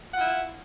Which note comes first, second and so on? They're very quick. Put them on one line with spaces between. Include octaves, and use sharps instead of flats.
F#5 F4 E4